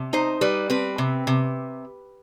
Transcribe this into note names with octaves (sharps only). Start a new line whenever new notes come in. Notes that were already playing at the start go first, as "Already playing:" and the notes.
Already playing: C3
D#4 C5
G3 B4
C4 B4
C3
C3